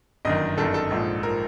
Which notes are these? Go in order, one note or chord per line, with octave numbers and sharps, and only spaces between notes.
G1 F#2 D#3 D#5
G1 F#2 D#3 A4
A4
A#1 G#2 F3
F3 A#4